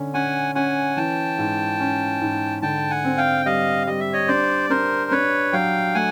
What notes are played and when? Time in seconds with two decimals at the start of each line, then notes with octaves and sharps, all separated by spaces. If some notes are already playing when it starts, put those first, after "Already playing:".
Already playing: D3 C#4
0.14 C#4 F#5 G#5
0.55 C#4 F#5 G#5
0.97 E3 G5 A5
1.38 G#2
1.80 C#4
2.21 G#2
2.62 D3 G5 A5
2.91 F#5 G#5
3.04 C4
3.18 F5 G5
3.46 G3 D#5 F5
3.87 G3 D#5
4.00 E5
4.13 C#5 D#5
4.28 D4 C5 D5
4.70 D4 A#4 C5
5.11 D4 B4 C#5
5.53 F#3 F5 G5
5.95 A3 F#5 G#5